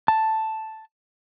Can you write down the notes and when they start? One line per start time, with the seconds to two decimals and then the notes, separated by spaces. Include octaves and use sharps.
0.08 A5